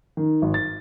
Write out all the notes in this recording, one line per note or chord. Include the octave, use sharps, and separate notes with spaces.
D#3
G#1
A6